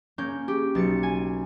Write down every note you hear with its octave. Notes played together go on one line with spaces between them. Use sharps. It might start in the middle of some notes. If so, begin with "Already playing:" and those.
A#3 C#4 G6
G4
B1 A6 C#7
G#5